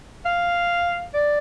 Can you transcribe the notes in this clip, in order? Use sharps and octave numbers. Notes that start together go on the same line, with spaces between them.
F5
D5